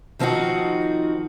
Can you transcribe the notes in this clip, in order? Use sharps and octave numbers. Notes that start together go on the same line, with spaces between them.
D#3 F3 C4 C#4 D#4 F#4